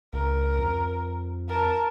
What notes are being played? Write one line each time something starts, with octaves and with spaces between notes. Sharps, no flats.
C#2 A#4
F2
A#4 A5